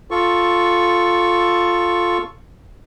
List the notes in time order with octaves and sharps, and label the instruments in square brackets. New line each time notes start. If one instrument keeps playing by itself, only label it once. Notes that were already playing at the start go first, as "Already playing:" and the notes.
[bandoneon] F4 A4 C#6